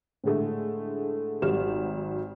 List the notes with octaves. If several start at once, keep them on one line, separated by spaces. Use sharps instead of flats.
A2 D3 G#3 A3
G#1 F#3 G3 F6 E7